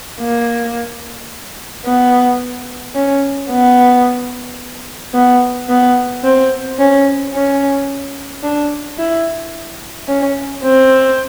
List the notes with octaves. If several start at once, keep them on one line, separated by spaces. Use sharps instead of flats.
A#3
B3
C#4
B3
B3
B3
C4
C#4
C#4
D4
E4
C#4
C4